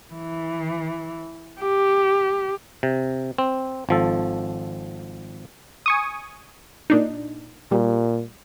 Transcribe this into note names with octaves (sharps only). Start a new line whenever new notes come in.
E3
G4
C3
C4
G#1 F3 A4
G#5 C#6 D#6
A#2 D4 D#4
A#2 G3